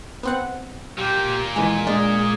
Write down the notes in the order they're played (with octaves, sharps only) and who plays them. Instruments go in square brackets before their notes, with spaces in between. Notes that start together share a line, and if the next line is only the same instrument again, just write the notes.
[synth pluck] B3 C4 F#5
[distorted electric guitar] A#2 A#3 [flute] G4
[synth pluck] D#3 E3 G#3 [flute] G#5
[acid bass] G#3 [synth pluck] D4 [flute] G#4